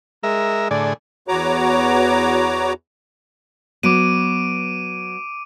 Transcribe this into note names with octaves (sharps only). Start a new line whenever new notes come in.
G#3 A#4 E5
A2 D3 G#4 D5
E2 B3 F#4 C#5 A#5 D6
F#3 B3 D6 D7 D#7